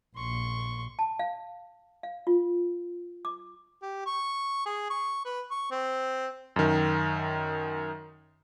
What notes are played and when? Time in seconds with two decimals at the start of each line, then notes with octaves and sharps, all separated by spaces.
0.16 A#1 C6 C#6
0.99 A5
1.19 F5
2.03 F5
2.27 F4
3.25 D6
3.82 G4
4.06 C#6
4.66 G#4
4.90 C#6
5.25 B4
5.51 C#6
5.71 C4
6.56 F#2 D#3